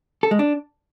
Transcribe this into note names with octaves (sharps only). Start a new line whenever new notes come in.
A4
G#3
D4